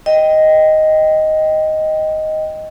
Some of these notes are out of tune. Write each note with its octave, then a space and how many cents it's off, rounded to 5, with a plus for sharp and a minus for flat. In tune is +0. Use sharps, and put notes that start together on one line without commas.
D#5 +5 G5 +0